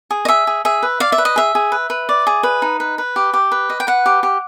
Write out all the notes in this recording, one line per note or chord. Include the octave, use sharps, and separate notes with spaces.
G#4
D#5
G#4 E5
G#4
G#4 E5
B4
D5 F5
E5
B4
D#5
G#4 E5
G#4
B4
B4
D5
G#4
B4
D#4
B4
B4
G4
G4
B4
D#5
G5
B4 F#5
G4
G4